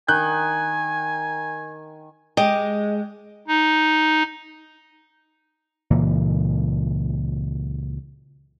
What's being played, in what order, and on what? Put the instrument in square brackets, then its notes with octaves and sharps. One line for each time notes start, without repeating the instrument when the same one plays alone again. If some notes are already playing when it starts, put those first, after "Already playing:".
[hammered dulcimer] D#3 [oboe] G#5 [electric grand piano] F#6 G6
[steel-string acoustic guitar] G#3 [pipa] G4 [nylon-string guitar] D#5
[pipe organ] D#4
[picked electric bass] C#2 A#2 E3 A#3